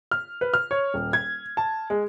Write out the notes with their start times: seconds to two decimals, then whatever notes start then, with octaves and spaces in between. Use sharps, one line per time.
0.11 F6
0.41 B4
0.54 F6
0.71 C#5
0.94 D#1
1.13 G#6
1.57 A5
1.90 G#3